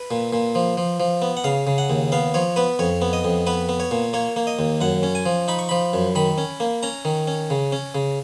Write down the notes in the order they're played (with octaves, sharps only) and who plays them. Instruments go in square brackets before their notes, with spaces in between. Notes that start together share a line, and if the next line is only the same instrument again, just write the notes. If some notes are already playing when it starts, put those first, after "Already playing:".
Already playing: [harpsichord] B4
A#2
A#2
F3
F3
F3
B3
F#5
C#3 F5
C#3
F#5
D#2
B3 F5
F3 C#5
B3 B4
F2 C#5
B3
D#5
F2
B3 B4
B3
C#5
A#2
A#3 C#5
A#3
D#5
D#2
F#2 F#5
C#4
G#5
F3
D#4 B5
C#6
F3 B5
F#2
D#3 B5
C#4
A#3
C#4 A#5
D#3
C#4
C#3
C#4
C#3